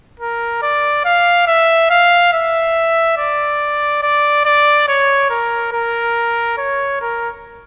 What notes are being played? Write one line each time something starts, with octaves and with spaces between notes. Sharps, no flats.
A#4
D5
F5
E5
F5
E5
D5
D5
D5
C#5
A#4
A#4
C#5
A#4